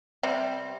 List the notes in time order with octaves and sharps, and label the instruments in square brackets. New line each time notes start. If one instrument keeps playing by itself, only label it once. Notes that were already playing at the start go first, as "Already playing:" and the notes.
[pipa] C3 G3